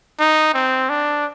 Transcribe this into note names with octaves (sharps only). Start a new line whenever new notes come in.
D#4
C4
D4